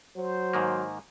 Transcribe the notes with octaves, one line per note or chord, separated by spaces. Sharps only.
F#3 C5
G#2 D#3 A#3